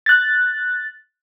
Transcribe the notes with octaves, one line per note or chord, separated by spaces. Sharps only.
F#6 A6